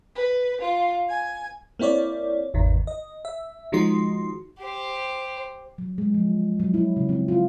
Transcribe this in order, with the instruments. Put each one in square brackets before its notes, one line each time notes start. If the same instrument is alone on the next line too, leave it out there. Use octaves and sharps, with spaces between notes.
[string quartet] B4
F4
G#5
[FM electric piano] A#3 C4 E4 C#5 D5
G#1 E2 D#3
D#5
E5
D#3 F3 G#3 D#4 F#4 C6
[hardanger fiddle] G4 C5
[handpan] F#3
G#3
F3
F#3
E4
C#3
C4
F4